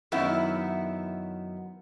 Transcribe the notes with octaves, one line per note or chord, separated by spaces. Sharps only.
F#2 D#3 B3 E4